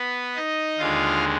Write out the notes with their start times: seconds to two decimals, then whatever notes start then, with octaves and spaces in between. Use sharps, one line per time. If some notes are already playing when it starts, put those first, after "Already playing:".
Already playing: B3 B4
0.36 D#4 D#5
0.79 D#2 D3 G#3 F4 F5